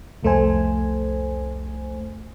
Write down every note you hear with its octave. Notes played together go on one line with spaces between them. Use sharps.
C2 F2 A3 A4 C5 G#5